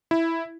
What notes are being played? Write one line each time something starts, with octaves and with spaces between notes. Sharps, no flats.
E4